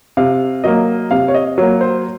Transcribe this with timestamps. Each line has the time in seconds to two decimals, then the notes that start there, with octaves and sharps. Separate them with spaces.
0.17 C3 F5
0.64 F#3 A#3 D#5
1.11 C3 F5
1.28 C#5
1.34 D#5
1.58 F#3 A#3 C#5
1.81 C5